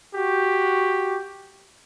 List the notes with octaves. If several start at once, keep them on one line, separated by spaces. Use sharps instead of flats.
F#4 G4